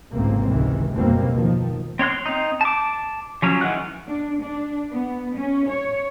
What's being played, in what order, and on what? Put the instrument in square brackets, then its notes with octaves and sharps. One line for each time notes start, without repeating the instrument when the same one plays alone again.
[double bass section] G#1 C#2 A2 C3 A#3 C4
C#2 C3 D#3 E3
F#1 D#2 B2 G3 A#3 C4
D#3 F3
[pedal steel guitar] C4 C#5 C6 F#6
C4 D#4
A5 D6
F3 F#3 C#4
D#3 E3 G#3 F#5 F#6
[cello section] D4
D4
B3
C#4
C#5